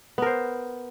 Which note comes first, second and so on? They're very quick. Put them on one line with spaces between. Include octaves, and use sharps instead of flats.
B3 A#4 C5